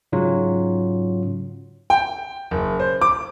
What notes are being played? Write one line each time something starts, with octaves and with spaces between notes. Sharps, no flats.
G#2 C#3 F#3 C#4 F4
G5
F#1
C5
D6